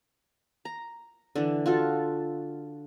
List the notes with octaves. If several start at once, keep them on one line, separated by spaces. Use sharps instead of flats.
A#5
D3 E3 D4
F4 F#4 A4